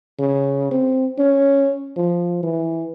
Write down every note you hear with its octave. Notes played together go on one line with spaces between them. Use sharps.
C#3
C4
C#4
F3
E3